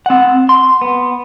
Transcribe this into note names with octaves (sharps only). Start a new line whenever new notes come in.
C4 F#5
C6
B3